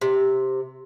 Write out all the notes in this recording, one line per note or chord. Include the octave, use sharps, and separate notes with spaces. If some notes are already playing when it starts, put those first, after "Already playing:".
C3